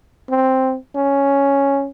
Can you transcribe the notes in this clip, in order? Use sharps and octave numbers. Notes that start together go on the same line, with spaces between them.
C4
C#4